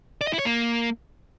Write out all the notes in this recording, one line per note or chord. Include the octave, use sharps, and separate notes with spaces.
D5
D#5
E4
C#5
A#3